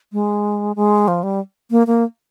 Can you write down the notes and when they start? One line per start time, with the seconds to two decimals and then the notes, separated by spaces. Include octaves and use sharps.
0.13 G#3
0.76 G#3
1.08 F3
1.23 G3
1.71 A#3
1.87 A#3